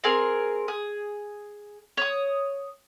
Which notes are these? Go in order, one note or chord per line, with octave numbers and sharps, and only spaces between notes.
C4 G#4 A#4
G#4
C#5 D#6